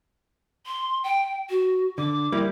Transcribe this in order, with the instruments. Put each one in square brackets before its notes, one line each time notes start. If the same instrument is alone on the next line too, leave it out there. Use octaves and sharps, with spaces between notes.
[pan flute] C6
G5
F#4
[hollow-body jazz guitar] D3 [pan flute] D6
[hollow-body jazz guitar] G3 A#3 E4